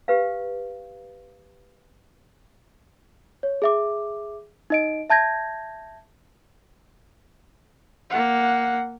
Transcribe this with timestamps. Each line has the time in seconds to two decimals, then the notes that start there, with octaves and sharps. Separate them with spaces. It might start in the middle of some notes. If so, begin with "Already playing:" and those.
0.08 G4 B4 F5
3.43 C#5
3.62 G#4 E5 D6
4.70 D#4 D#5 D7
5.10 E5 A5 G6 G#6 A#6
8.10 A#3 F#5